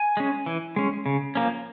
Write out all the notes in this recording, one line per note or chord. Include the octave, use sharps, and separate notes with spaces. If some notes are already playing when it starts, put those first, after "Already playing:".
Already playing: G#5
G#3 C#4
E3
G#3 C#4
C#3
F3 A#3 C#4